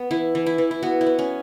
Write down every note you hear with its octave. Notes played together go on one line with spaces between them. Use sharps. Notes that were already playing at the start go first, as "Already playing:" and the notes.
Already playing: B3
E3 E4
E3
E4
E3
E4
B3 F#4
E4
B3
C#4